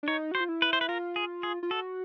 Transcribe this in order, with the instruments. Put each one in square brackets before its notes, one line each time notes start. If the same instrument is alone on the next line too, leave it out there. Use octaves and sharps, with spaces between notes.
[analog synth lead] D4
[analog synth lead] D#4 [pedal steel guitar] C#5
[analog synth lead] F#4
[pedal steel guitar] C5
[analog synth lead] F4
E4
[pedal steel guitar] B4
C5
B4
[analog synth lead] F4 [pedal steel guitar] A#4
[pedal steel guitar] G#4
G#4
[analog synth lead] F4
[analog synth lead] F#4 [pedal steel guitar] A4